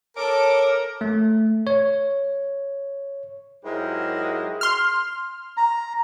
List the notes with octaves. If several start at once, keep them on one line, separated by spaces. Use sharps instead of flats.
A4 A#4 C#5 D6
A3
C#5
G#2 F#3 G#3 E4 G4 A#4
C6 F6
A#5